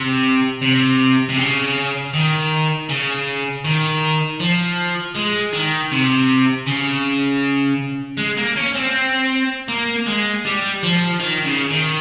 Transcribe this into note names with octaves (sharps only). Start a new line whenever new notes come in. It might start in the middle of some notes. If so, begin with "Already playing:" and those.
Already playing: C3
C3
C3
C#3
D#3
C#3
D#3
F3
G#3
D#3
C3
C#3
G#3
A#3
C#4
C4
A#3
G#3
G3
F3
D#3
C#3
D#3